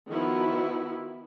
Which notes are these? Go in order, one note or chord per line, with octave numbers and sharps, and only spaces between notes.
D#3 F3 B3 E4 F#4